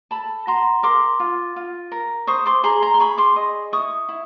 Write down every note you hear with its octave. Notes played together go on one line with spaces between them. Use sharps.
A4 A5 B5
F#4 A#5 C6
A#4 C6 D6
F4
F4
A#4
C5 C#6 D#6
C6 D6
G#4 A#5 C6
A#5 C6
C6
G#4 B5 C#6
C6 D6
D#5
E4 C#6 D#6
E4